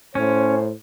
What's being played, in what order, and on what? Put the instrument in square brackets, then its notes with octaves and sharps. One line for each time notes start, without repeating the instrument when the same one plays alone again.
[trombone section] A2 C5 [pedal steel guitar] C#4